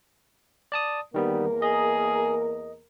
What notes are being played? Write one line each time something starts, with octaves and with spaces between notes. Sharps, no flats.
D5 A5 D#6
E2 D#3 G3 A#3 B3 A#4
G#4 D#5